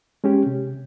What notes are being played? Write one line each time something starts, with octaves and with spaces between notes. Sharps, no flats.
G#3 C#4 G4
C3